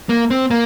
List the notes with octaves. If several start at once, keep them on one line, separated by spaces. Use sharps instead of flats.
A#3
C4
A#3